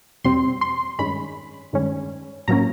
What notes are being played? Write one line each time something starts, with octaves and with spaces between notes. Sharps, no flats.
E2 B2 G3 C4 C6
C6
G2 D#3 G#3 C#4 B5
G2 D#3 G#3 C#4
A2 F#3 A#3 C#4 A#5